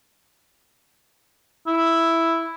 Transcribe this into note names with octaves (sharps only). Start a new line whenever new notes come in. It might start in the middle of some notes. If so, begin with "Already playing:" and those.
E4